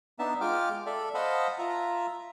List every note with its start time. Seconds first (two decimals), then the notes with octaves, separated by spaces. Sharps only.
0.19 B3 D4 D#4 E5 A5
0.41 G#3 F4 G5 D6 F6
0.86 A4 D5 E5
1.14 C5 D#5 F5 F#5 A5 B5
1.58 F4 E5 A#5